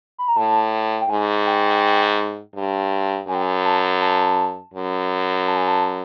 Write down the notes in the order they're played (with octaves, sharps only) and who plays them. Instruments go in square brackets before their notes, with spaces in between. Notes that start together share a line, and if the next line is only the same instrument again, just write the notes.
[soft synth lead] B5
A#5
[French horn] A2 [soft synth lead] A5
[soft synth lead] G5
[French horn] G#2 [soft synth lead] G#5
[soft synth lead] G5
[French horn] G2
[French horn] F#2 [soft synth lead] G#5
[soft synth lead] G5
G#5
A5
A5
[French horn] F#2
[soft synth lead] A5
G#5
A5